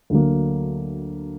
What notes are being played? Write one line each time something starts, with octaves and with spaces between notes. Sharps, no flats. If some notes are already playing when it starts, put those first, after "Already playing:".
D2 D3 F#3 A#3